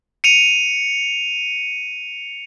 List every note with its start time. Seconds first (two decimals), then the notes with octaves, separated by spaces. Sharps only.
0.24 C#7 D#7 F7